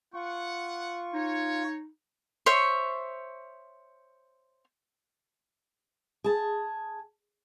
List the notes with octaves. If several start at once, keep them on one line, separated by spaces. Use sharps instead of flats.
F4 F#5 C#6
D#4 C#5
C5 C#5 E5 C#6
G#4 A5